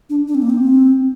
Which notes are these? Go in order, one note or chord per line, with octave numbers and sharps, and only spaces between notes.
D4
D4
C4
A#3
C4